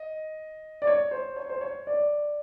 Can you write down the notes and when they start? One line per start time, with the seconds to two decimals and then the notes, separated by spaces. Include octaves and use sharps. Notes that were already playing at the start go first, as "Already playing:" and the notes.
Already playing: D#5
0.82 D5
0.87 C#5
1.11 C5
1.36 C#5
1.49 C5
1.61 C#5
1.87 D5